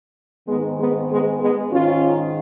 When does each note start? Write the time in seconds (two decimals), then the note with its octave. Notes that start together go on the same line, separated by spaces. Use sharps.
0.47 G#2 D#3 G#3 B3
0.78 G#3 B3
1.08 G#3 B3
1.39 G#3 B3
1.69 G#2 D#3 C#4 F4